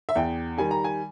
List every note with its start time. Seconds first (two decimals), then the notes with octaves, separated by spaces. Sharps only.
0.09 E5
0.16 E2 G5
0.57 D#3 G3 G#5
0.71 A#5
0.84 G#5